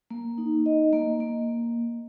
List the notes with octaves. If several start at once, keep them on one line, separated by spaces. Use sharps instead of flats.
A#3
D#4
D#5
A#3
A#3